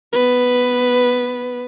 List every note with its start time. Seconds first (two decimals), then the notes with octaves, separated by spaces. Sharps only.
0.12 B3 B4